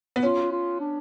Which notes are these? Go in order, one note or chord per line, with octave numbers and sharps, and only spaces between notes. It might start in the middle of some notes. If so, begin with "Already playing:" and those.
B3
C#4 F4
F4
D4